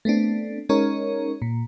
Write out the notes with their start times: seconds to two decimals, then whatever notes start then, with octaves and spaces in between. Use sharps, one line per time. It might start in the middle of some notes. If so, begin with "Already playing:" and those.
0.05 A3 B3 C4 D4
0.69 G#3 C#4 D#4 A#4 C#5
1.42 A#2